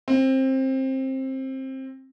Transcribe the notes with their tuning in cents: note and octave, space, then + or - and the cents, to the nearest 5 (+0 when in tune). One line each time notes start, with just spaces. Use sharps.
C4 +20